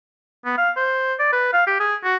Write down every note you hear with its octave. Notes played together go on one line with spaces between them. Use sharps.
B3
F5
C5
D5
B4
F5
G4
G#4
F#4